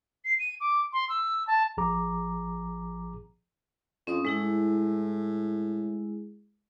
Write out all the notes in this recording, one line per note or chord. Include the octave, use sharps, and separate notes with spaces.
C7
D#7
D6
C6
E6
A5
A1 F3 G#4 A#5 D6
F2 C#4 C#6 D#6
A2 G#3 E4 G#4